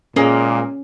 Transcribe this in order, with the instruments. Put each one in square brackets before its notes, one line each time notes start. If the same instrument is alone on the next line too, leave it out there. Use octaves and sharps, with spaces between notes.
[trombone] A#2 [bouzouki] G#3 A#3 [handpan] C#4